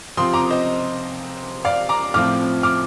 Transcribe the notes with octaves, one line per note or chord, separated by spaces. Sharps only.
C3 F3 C4 F4 C6 D#6
A#5 D6
C5 D#5
D5 F5
A#5 D6
A2 F3 C4 F4 D6 F6
D6 F6